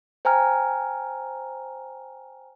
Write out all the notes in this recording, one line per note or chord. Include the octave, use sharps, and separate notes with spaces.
C5 G5 G#5 A#5 F6